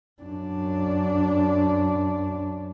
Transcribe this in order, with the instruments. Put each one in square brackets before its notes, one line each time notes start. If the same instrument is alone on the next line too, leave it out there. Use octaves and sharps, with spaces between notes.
[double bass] F#2 D4